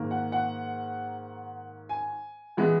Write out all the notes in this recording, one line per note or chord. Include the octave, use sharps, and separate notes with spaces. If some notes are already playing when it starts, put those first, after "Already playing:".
Already playing: G#2 D#3 A#3
F#5
F#5
G#5
E3 G#3 B3